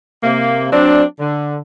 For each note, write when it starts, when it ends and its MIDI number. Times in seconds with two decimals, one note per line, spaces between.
0.23 0.68 48
0.23 0.68 58
0.72 1.02 54
0.72 1.02 60
0.72 1.02 62
1.19 1.57 50